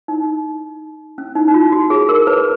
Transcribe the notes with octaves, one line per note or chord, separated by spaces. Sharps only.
D#4
C#4
D#4
D#4
F4
F#4
G#4
A#4
B4